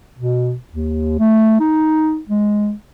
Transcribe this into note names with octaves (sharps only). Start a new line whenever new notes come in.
B2
D#2
A3
D#4
G#3